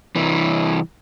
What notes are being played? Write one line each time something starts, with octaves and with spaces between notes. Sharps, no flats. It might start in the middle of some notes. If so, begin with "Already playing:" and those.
C2 E3